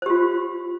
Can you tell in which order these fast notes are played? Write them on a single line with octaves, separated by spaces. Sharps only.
C5 G4 F4